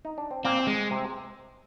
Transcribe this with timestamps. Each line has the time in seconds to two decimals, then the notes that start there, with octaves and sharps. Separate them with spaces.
0.05 D#4
0.18 D4
0.31 C4
0.44 A#2 A#3 C4
0.67 G#3
0.90 C3 C4